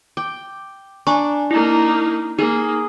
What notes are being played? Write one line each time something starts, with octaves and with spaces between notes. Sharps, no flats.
G5 D6
D4 G#5 A#5 C#6
A#3 D#4 E4
A#3 D#4 G#4